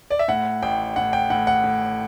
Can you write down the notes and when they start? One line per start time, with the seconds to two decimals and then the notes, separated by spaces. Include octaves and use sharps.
0.10 D5
0.19 E5
0.28 A2 F#5
0.62 A1 G5
0.96 A2 F#5
1.13 G5
1.30 A2 F#5
1.47 F#5
1.64 A2